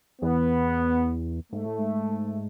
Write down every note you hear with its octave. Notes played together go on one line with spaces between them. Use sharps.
E2 B3
G#2 A3
A2
G#2